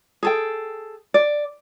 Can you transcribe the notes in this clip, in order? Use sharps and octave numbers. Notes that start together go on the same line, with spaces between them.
G#4 A4 G5
D5